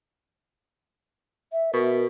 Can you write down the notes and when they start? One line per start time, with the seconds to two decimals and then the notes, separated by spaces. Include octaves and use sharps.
1.52 E5
1.74 B2 A#4